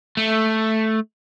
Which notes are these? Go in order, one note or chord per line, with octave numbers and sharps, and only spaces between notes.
A3